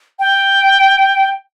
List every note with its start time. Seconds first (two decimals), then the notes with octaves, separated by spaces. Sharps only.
0.20 G5